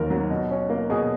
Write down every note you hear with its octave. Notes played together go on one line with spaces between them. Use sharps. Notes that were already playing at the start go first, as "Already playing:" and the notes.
Already playing: D#2 D#3 F#3 A#3 A#4
F#3
B2
C#4
A#3
B2 G#4